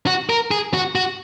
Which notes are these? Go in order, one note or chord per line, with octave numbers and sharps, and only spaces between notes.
F#4
A#4
G#4
F#4
F#4